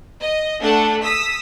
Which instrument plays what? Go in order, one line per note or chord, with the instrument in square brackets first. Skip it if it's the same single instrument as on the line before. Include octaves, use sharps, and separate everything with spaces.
[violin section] D#5
A3 D4 A4 F#5
D#6 E6 B6